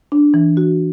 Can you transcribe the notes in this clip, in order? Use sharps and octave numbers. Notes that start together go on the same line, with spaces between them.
D4
E3
F#4